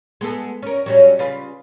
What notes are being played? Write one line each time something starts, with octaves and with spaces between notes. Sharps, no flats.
G#3 B3 A4
C#4 A#4
F#3 G3 C#4
C#3 F4 B4